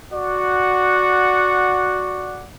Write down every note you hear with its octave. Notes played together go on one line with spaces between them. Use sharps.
F#4 D5 F#5